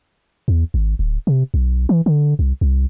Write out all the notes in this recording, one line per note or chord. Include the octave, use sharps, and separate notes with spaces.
E2
G#1
D1
C3
B1
E3
D3
C2
C2